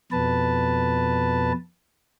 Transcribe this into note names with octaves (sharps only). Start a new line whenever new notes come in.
F2 B2 B4 A5